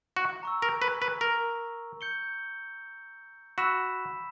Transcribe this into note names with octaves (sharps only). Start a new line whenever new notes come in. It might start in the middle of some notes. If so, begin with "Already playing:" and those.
F#4
A#5 C#6 E6
A#4
B4
B4
A#4
G6 C#7 G7
F#4 B5 E6 B6 E7